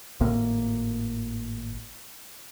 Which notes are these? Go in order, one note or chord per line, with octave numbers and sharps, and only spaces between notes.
G#1 A2 A#3